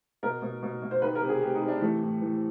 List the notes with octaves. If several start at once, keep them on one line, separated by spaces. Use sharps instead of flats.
B2 A#4
B2
B2
B2
C5
D#3 B4
A#4
C3
G#4
C3 G4
D#4
C3
D4
E3 A3
A2
E3